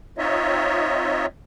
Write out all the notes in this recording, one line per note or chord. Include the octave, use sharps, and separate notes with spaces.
C4 D#4 F4 C#5 D#5 E5